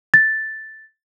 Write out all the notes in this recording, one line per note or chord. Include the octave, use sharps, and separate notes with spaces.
A6